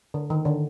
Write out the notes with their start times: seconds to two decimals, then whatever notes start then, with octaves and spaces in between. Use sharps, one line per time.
0.14 D3
0.30 D#3
0.45 D3